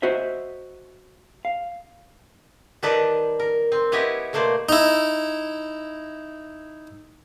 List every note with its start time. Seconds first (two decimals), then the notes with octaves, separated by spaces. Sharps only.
0.02 F#4 C5 D#5 E5
1.45 F5
2.83 D#3 G3 A4 B4 D5 D#5
3.40 A#4
3.72 C4
3.92 B3 E4 G4 C#5 D#5 G#5
4.33 B2 A3 A#3 C5 D5
4.69 D#4 E4